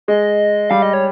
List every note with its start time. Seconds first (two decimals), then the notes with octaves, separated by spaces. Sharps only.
0.08 G#3 D#5
0.70 G3 F5
0.82 D#5
0.93 C#5